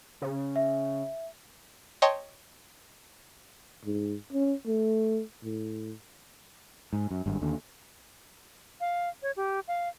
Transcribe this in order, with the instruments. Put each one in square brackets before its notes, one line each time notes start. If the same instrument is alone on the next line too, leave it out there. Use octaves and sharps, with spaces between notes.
[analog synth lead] C#3
[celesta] E5
[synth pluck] C#5 D#5 G5 A5 C6 C#6
[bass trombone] G#2
C#4
A3
A2
[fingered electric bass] G#2
F#2
G#1 G2
D#2 D3
[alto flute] F5
C#5
G4
F5